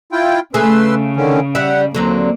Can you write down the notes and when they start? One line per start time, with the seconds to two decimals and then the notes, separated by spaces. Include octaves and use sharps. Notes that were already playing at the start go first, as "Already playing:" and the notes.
0.12 E4 F4 G5
0.54 C#3 A3 G#4 B4 C6 E6
1.17 D3 D#3 C#4
1.55 G3 E5 F#5
1.95 D#2 D3 F#3 A#3 C4